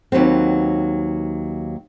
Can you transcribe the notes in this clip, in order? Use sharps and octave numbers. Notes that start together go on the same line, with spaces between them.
D#2 F#3 B3 C4